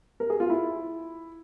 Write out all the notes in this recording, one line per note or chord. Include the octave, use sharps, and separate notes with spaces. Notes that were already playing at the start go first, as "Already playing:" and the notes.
A#4
G#4
F4
E4